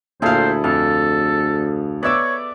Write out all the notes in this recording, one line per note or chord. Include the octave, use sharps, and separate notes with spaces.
D2 A#2 E4 G#4 A4 C5 F5
F2 A4 F5
B3 C#5 D5 E5 D6 E6